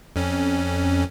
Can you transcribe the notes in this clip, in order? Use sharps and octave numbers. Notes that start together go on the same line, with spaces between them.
F2 C#4